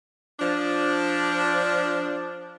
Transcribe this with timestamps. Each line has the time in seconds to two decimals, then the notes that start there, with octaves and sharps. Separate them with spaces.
0.40 F3 D4